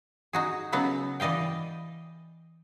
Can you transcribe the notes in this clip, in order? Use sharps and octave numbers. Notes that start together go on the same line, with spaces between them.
D#4 F#4 G#4
C#3 F#3 B3 F#5 A#5
E3 D5 D#5 F5 G5